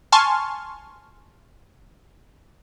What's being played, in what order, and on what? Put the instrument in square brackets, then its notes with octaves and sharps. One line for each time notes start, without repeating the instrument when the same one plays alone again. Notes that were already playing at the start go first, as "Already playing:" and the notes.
[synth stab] G#5 A5 C6 C#6 F6